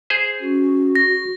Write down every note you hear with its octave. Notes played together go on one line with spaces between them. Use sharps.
G#4 C5
C#4 F#4
A#6